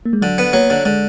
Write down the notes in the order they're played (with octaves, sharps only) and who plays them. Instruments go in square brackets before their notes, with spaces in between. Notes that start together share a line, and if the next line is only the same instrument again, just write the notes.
[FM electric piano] A#3
G#3
[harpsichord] D3 [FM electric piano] F#3
[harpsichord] B3
[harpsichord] F#3 [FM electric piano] A#3
[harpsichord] D3
[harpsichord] D3 [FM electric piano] G#3